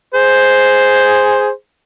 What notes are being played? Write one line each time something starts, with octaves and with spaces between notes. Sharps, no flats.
G#4 C5